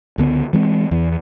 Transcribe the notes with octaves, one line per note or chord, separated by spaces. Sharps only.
C#2 D3 B3
E3 G#3 C4
E2 E3